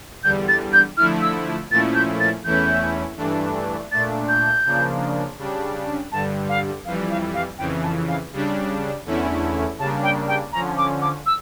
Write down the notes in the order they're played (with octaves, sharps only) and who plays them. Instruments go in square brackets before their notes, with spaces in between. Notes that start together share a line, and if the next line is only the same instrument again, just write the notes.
[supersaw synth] E2 D3 G3 [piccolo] G6
[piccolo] A6
G6
[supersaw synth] D3 F3 A3 E4 [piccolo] F6
[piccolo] E6
[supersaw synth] A#2 F3 A3 C#4 E4 [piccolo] A6
[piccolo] G6
A6
[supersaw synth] E2 E3 A3 C#4 E4 [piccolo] G6
[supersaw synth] G2 E3 A3 D4
[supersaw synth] A#2 A3 D4 [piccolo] A6
[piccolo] G6
[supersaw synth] C#3 F3 A#3 D4
C#3 G3 D4
[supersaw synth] G2 D3 G3 [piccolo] A5
[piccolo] F5
[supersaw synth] F2 E3 G3 [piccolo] F5
[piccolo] F5
F5
[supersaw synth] F2 C#3 E3 [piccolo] G5
[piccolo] A5
F5
[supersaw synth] C#3 G3 D4
E2 D3 A3 C#4 E4
[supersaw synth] C#3 G3 A#3 D4 [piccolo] A5
[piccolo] G5
G5
[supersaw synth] D3 F3 C#4 [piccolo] A#5
[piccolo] D6
D6
E6